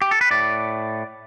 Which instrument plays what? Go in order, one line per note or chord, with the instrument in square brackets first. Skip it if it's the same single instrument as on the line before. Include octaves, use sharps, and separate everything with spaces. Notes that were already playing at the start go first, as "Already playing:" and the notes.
[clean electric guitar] G4
A4
B4
A2 D5